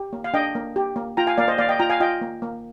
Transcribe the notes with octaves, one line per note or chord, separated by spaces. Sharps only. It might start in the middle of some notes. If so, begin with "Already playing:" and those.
Already playing: G4
A#3
F5
D4 D#5 G5
A#3
G4
A#3
F4 G5 A#5
F5 G#5
A#3 D5 F5
C5 D#5
A#3 D5 F5
D#5 G5
F4 G5 A#5
F5 G#5
F4 D#5 G5
A#3
A#3